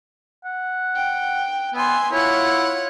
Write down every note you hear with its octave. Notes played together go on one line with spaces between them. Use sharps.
F#5
G5
B3 E5 G#5 C6
E4 F4 C#5 F#5